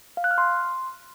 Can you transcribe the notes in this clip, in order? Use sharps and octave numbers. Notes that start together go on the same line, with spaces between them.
F5
F#6
F6
C6